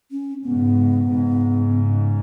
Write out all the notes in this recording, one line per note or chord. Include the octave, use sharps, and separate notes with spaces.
C#4
G#2 C#3 B3
G#2 C#3